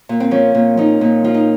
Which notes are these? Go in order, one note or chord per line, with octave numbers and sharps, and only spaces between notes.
A#2
C4
F3 C#4
A#2
F3 D#4
A#2
F3 F4
D#4